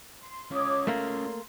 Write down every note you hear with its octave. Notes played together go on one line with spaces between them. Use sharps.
C6
C#4 F4 C#5 D6 D#6
A3 A#3 C6